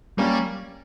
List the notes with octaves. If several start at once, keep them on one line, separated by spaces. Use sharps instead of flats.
G3 A#3 C#4